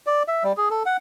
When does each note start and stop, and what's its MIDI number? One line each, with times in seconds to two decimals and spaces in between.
0.07 0.23 74
0.28 0.44 76
0.44 0.53 55
0.57 0.69 68
0.70 0.83 69
0.86 0.97 78